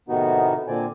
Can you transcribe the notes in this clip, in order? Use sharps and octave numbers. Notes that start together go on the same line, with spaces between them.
A2 C3 D#3 B3 D#4 F#4
A#2 D3 C4 D5 G#5